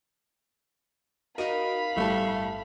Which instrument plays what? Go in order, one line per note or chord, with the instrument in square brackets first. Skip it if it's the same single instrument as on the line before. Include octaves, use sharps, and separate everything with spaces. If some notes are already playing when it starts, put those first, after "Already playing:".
[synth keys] D#4 F#4 A#4 [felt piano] D#5 D#7 [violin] F5 B5
[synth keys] G1 A5 [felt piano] A2 G3 [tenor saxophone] A3